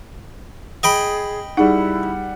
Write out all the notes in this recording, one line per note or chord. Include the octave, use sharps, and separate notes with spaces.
G#4 D#5 G5 B5
G3 D#4 E4 G#4 F#5